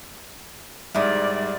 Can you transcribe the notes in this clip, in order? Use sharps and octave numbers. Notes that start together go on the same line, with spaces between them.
G#2 G3 E4 A#4 D5 D#6